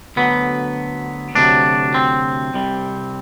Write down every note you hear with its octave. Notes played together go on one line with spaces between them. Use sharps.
D2 D3 F#3 B3
D2 C3 F#3 D4
C4
C2 C3 G3